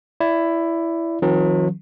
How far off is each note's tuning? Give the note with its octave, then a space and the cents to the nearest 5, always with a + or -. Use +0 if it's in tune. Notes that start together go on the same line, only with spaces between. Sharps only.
E4 +10 D5 -15
D#3 +35 F#3 -40 C#4 -35